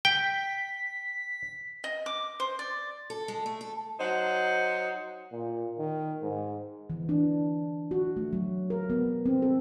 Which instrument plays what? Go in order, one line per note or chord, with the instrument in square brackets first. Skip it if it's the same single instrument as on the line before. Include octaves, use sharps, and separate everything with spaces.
[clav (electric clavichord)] G5 [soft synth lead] B6
[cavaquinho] D#5
D6
C5
D5
[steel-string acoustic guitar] A4
G#3
A3
A4
[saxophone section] F#3 D#4 C5
[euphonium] A#2
D#3
G#2
[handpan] E3
D4
F#4
A3
F#3
A#4
B3
C4
A4